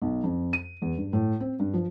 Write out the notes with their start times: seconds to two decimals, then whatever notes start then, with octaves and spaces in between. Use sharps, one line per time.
0.02 B1
0.23 F2
0.53 D#7
0.82 E2
0.97 G2
1.13 A2
1.40 C4
1.59 G2
1.74 F3